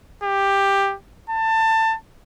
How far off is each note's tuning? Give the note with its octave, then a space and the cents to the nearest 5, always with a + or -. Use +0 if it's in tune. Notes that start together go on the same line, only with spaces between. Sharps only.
G4 +10
A5 +20